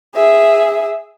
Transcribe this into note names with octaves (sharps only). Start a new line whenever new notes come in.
G#4 E5